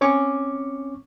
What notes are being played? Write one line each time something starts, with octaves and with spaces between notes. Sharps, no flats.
C4 C#4 C#5 C#6 D6